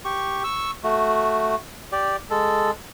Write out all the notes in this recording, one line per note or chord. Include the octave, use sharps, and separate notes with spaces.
G4 C#6
C#6 E6
A3 F#4
G4 D5
G#3 A4